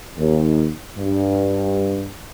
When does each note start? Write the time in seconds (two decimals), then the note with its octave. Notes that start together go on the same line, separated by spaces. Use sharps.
0.18 D#2
0.98 G2